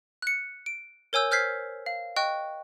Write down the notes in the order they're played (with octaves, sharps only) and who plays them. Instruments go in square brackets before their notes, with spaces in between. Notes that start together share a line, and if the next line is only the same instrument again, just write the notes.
[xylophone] F#6 C#7
D7
A#4 C#5 G#5 E6 G6
C5 F6 G6 G#6 B6 C7
F5
D#5 G5 C#6 F#6